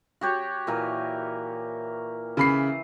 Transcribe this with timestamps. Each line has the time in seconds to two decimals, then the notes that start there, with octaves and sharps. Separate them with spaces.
0.21 F#4 G4 C#5
0.67 A#2 E3 A#4
2.37 C#3 E3 B5 C7